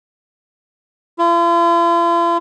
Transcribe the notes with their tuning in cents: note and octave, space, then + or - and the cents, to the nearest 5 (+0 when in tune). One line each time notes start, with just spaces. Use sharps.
F4 -45